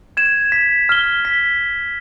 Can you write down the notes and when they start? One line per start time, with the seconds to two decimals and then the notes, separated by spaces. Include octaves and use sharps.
0.17 G#6 E7
0.52 B6
0.89 F6 G7
1.25 B6